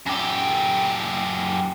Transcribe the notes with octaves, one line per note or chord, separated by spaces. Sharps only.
F#2 G4